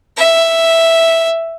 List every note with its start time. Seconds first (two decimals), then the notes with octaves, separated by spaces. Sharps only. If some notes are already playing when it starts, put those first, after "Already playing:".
0.17 E5